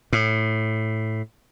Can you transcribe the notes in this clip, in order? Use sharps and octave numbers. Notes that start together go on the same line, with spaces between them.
A2